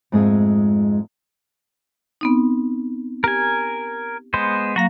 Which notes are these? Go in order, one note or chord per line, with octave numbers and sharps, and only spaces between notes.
F2 G#2 G#3 A3 F4 G#4
B3 C4 D#4
G4 A#4 G#5
G#3 B3 C5
F#3 A#3 F#4 F5 A#5